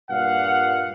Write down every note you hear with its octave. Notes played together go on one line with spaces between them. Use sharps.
G2 A#2 F5 F#5